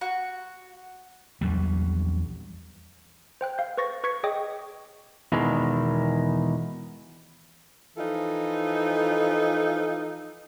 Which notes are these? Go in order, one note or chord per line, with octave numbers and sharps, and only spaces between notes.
F#4
A#1 E2 F#3 G3
C5 G5 F#6
F5 G6
B4 C5 C#6 A6 A#6
B4 C#6 G#6 B6 C#7
G#4 C#5 D#5 G5 D6 D#6
E2 B2 D#3 E3 G#3
E3 F3 D#4 F4 A4